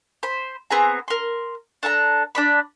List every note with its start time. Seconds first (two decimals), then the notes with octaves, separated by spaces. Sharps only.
0.23 C5 B5
0.71 B3 C4 G#4 A#5
1.08 A#4 C6
1.83 D4 A4 A5 A#5
2.35 D4 D5 B5